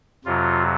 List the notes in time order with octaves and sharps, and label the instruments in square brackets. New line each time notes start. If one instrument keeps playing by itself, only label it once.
[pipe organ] F2 C3 F#3 F4